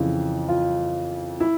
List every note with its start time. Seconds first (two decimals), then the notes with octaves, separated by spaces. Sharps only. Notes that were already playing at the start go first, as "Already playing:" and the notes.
Already playing: F2 C#3 E3 F4
0.49 F4
1.40 E4